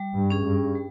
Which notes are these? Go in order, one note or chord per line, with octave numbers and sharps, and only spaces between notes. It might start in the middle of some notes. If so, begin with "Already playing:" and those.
Already playing: G3
G2
C#4 G#4
G2
G3